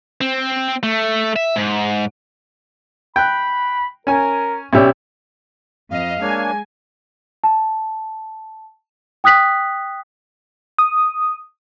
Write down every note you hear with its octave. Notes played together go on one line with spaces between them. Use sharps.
C4
A3
E5
G#2
G5 B5 F#6
C#4 A#4 G#5
B1 B3 C#4 G4 D5 E5
F2 D#5 F5
G#3 A#3 D4 C#5 G#5
A5
G5 D#6 F#6 B6 F#7
D#6